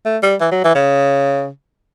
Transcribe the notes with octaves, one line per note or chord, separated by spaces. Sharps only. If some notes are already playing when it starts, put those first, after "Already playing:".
A3
G3
E3
F#3
E3
C#3